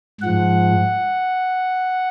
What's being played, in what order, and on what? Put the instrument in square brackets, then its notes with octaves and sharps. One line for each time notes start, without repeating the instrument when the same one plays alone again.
[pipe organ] G#2 F3 F#5